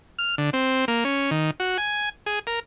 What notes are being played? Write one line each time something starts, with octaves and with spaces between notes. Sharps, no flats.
F6
D3
C4
A#3
C#4
D#3
F#4
G#5
G#4
A#4